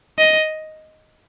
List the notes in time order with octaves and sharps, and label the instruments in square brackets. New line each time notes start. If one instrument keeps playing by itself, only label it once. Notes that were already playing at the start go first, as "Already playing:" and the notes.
[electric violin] D#5